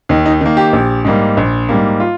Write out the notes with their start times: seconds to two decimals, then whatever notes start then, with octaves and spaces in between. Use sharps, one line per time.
0.09 D#2 D#4
0.26 D#4
0.41 D#3 A#3
0.57 G4
0.73 A#1
1.05 G#2 G3 A#3
1.37 A#1
1.69 G#2 G3 A#3
2.00 F4